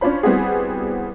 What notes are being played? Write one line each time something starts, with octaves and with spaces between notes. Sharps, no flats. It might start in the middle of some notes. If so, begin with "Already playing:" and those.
C#4 D4 F4 C5 B5
G3 B3 C4 E4 F#4 G#4